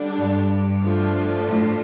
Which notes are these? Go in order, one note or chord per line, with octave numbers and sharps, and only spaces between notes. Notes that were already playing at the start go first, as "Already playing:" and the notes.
Already playing: D3 G3 D4
G2
D3 F3 A3 D4 F4
A2